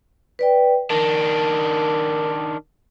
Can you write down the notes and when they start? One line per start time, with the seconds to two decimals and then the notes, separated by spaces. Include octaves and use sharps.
0.39 B4 D5 G5
0.90 D#3 D4 A#4